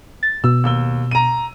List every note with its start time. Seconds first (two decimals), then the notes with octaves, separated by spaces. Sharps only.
0.23 A6
0.44 B2 E6
0.64 D#2 E6 G7
1.11 A#5 D#7